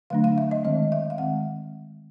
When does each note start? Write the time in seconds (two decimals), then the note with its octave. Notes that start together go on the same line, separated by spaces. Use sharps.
0.10 D3 F#3 A3 D4 F5
0.24 F5
0.38 E5
0.51 D#5
0.64 D#3 G#3 C4 D#5
0.92 E5
1.10 F5
1.18 D#3 G#3 C4 F#5